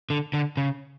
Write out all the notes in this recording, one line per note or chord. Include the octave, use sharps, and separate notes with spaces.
D3
D3
C#3